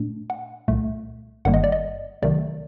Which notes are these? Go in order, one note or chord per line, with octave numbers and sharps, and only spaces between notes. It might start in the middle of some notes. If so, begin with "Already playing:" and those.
Already playing: A#2 A3 D4
F#5
C2 A#2 A3
G1 G2 D#3 G3 A#3 F#5
D#5
D5
D#5
C2 C3 D#3 F#3 A3 D5